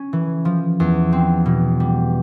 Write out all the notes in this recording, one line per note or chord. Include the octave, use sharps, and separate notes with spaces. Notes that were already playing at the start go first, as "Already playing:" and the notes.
Already playing: C#4
E3
F3
E2
C4
B2
G3